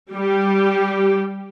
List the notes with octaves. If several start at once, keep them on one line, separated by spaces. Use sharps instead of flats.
G3 G4